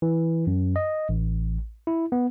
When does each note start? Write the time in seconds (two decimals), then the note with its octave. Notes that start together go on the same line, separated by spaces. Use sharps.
0.02 E3
0.47 F#2
0.76 D#5
1.09 A1
1.87 E4
2.12 B3